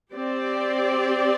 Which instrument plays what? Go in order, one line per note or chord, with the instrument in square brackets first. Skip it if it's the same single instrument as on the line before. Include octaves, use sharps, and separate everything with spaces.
[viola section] C4 G4 D5